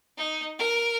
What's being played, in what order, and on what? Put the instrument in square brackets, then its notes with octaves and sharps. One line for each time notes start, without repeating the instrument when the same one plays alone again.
[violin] D#4
A#4